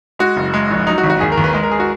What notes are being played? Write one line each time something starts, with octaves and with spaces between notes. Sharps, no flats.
G#3 F#4
F#1
G#3
A#1
F#3 D#4
F#4
G#1
F#4
D#2 G#4
A#4
D#2
B4
G#3
A#4
G#4
F#4